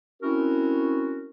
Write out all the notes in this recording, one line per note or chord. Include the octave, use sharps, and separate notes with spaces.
C4 C#4 E4 F#4 A#4